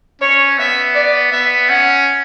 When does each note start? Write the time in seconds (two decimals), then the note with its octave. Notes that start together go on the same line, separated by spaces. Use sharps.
0.21 C#4 C#5
0.58 B3 E5
0.95 D5
1.32 B3 E5
1.69 C#4 F#5